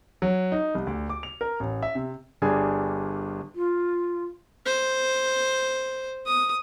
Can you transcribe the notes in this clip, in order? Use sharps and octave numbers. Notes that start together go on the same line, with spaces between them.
F#3
D#4
C2
D2
D6
F7
A#4
A1
E5
C3
G1 G3 D4 G#4 G#5
F4
C5
D#6